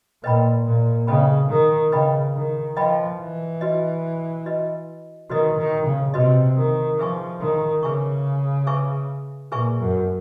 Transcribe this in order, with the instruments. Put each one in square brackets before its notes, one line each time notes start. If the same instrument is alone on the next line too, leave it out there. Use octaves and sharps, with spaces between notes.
[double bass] A#2 [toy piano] B4 D#5 G5 B5
[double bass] A#2
[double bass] C#3 [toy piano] B4 D#5 G5 B5
[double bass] D#3
[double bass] C#3 [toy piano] B4 D#5 G5 B5
[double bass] D#3
[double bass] F3 [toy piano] B4 D#5 G5 B5
[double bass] E3
[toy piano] F#4 B4 D#5
F#4 B4 D#5
[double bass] D#3 [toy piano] F#4 B4 D#5
[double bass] D#3
C#3
[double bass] C3 [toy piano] F#4 B4 D#5
[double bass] D#3
[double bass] F3 [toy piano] G#4 B4 E5 G#5 C#6
[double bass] D#3
[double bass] C#3 [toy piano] G#4 B4 E5 G#5 C#6
[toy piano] G#4 B4 E5 G#5 C#6
[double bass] A#2 [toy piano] G#4 B4 E5 G#5 C#6
[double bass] F#2